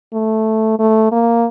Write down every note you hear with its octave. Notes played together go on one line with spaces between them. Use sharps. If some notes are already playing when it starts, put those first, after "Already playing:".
A3
A3
A#3